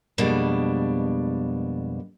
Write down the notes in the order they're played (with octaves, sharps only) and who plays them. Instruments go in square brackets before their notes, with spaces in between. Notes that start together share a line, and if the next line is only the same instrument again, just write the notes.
[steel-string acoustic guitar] F2 B2 G3 G#3 A#3 D4